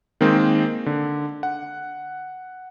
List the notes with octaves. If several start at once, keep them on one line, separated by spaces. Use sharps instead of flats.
D#3 G#3 A#3 C4 D#4
D3
F#5